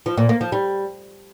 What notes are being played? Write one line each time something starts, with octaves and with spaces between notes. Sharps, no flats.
F3
A#2
A#3
F3
G3